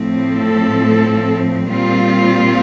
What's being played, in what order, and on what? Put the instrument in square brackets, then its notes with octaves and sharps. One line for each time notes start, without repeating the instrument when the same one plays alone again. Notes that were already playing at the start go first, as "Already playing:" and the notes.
Already playing: [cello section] A2 F3 C4
A4
A#2 G3 C4 F4